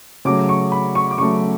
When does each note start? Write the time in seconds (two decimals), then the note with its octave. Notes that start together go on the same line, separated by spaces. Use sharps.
0.25 C#3 F#3 A3 D6
0.49 C#6
0.72 B5
0.95 C#6
1.11 D6
1.18 C#3 F#3 A3 C#6